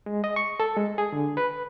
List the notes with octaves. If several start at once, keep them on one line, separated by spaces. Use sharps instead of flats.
G#3
D#5
C#6
A4
G#3
G#4
D3
B4